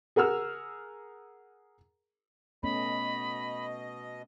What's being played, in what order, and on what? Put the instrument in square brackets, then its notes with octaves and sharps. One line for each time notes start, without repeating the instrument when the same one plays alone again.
[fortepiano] G#4 A#4 F#5 E6 F6
[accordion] B2 D#5 [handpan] A3 B3 C#4 [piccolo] B5